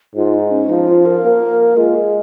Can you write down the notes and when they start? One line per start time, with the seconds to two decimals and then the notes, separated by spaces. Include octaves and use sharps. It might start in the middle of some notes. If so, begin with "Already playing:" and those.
0.16 G#2 F4
0.34 D#4
0.51 C#4
0.69 F3 D#4
0.87 F4
1.05 A#4
1.23 A#3
1.77 G#3 F4
1.95 G#4